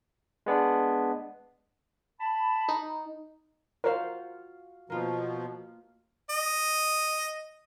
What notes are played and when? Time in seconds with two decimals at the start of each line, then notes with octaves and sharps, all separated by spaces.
0.46 G#3 B3 D4
2.20 A5 B5
2.69 D#4
3.84 F4 F#4 A#4 C5 F5
4.90 B2 F3 A#3 F4
6.30 D#5